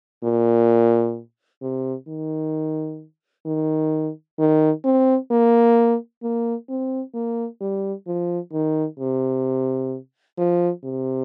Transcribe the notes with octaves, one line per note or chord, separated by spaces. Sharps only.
A#2
C3
D#3
D#3
D#3
C4
A#3
A#3
C4
A#3
G3
F3
D#3
C3
F3
C3